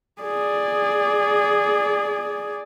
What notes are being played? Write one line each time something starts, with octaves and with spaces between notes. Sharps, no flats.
G#4 D5